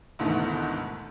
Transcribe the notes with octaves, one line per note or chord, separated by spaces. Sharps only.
D2 G#2 B2 D#3 E3 A3